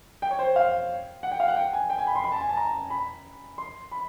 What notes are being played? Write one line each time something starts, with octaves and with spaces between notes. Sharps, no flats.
G5
C#5
C5
F5
F#5
G5
F5
F#5
G5
G#5
G5
G#5
B5
C6
B5
A5
G#5
A5
A#5
B5
C6
B5